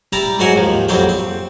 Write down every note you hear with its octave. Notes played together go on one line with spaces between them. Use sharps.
G3 E4 D5 A#5
G#2 F#3 F#4 A#4 F#5 G#5
D#2 F3
A#1 F2 F#3 G3 C4 G5
C4